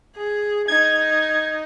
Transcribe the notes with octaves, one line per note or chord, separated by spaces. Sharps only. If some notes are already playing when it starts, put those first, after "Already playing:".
G#4
D#4 G#6